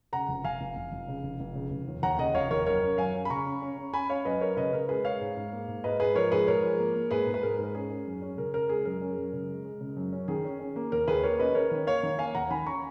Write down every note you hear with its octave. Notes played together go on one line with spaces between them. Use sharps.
C#3 F#5 A#5
F1
F1 F5 G#5
F1
F1
F1
C#3
F1
F1
C#3
F1
D#2
D#2 F#5 A#5
C#3 D#5 F#5
F1 C#5 F5
D#2 A#4 C#5
F#2 A#4 C#5
C#4
F#2 F5 G#5
C#4
B5
C#3 A#5 C#6
C#4
C#4
C#4
C#4 G#5 B5
C#4 C#5 F5
F#2 B4 D#5
F#2 A#4 C#5
C#3 B4 D#5
C#3 A#4
G#3 G#4 B4
G#3 C#5 F5
G#2
G#2
A#3
G#2
G#2 B4 D#5
G#2 G#4 B4
F3 A#4 C#5
G#2 G#4 B4
G#2 A#4 C#5
F3
A#3
A#3
G#2 G#4 B4
G#2
B4
G#2 A#4
G#2 A#4
C#4 G#4
C#4
F#2
C#4
C#3 A#4
C#3 A#4
G#3 G#4
F#2 A#4
C#4
F#2
C#3
G#3
G#3
C#3
F#2
C#4
D#3 G#4
C#4
C#4
A#3
D#2 A#4
D#2 G#4 B4
A#3 A#4 C#5
C#4 B4 D#5
C#4 A#4 C#5
D#3
A#3 C#5 F5
D#3
A#3 F5 G#5
D#2 F#5 A#5
D#3 G#5 B5
C#4 A#5 C#6